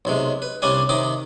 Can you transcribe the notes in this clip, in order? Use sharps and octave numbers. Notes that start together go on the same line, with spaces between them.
B1 C3 G#3
B4
C2 G3 C#4 D4 G#5
C3 D#3 D#4 D6